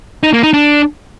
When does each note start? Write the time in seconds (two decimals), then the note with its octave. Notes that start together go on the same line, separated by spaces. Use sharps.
0.23 D#4
0.33 A#3
0.43 D#4
0.53 D4